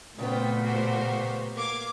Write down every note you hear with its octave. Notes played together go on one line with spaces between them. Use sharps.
A#2 C#3 F#3 A3 B3 C4 G5
F#4 G4 C5
A#3 F5 D6 G#6